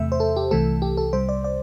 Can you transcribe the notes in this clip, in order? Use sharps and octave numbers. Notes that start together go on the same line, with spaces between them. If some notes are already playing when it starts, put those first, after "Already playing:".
Already playing: E2 C3 A3 E5
C5
A4
G4
C2 C3 E3 A3 A4
G4
A4
C2 C3 G3 C5
D5
D5